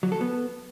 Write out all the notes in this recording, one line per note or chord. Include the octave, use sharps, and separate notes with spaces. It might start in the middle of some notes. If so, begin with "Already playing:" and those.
F#3
A4
B3